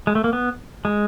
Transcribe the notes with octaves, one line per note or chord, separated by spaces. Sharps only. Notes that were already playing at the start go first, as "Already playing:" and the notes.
G#3
A3
A#3
B3
G#3